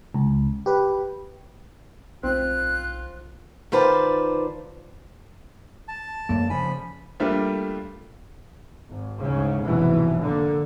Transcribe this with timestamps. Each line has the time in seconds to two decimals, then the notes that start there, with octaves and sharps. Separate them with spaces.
0.14 C#2
0.66 G4 B4
2.23 B1 C4 F4 F#6
3.72 D#3 F4 B4 C5 D5 A5
5.88 A5
6.29 F#2 A3 A#3
6.50 C#3 F3 G#5 B5
7.20 G3 A3 A#3 D4 F4 A4
8.90 G#1
9.23 D2 G#2 C#3
9.64 F1 G#2 B2 E3 F#3
10.19 D3 A#3